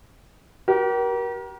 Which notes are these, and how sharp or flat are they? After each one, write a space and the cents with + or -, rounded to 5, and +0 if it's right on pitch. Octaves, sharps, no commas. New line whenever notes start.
G4 -35 A#4 +30